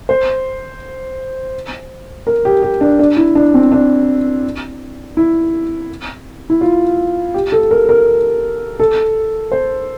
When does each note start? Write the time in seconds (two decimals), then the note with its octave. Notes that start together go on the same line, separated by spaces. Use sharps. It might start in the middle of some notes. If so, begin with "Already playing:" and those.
0.09 C5
2.27 A#4
2.45 G4
2.63 G4
2.81 D4
2.99 D4
3.17 E4
3.35 D4
3.54 C4
3.72 D4
5.17 E4
6.50 E4
6.61 F4
7.34 G4
7.52 A4
7.71 A#4
7.89 A#4
8.80 A4
9.52 C5